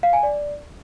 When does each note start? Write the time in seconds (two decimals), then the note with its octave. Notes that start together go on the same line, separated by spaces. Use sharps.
0.03 F5
0.13 G#5
0.23 D5